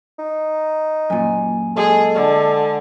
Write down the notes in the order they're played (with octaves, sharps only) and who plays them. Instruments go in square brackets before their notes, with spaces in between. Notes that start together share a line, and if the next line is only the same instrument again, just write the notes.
[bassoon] D#4
[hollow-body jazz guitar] F#2 A#2 [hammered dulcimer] G#5
[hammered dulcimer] G#3 [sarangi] G#4 [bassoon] A4
[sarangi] D3